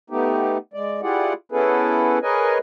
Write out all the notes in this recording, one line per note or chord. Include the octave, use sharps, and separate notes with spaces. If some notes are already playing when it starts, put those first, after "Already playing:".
A3 B3 D#4 G4
G#3 D5
E4 F4 G4 G#4 D5 F#5
B3 C#4 E4 G#4 A4 B4
G#4 A#4 B4 C#5 D#5 G#5